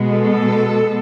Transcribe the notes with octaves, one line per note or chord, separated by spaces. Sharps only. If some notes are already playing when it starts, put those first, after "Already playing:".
Already playing: B2 G#3 B3
A4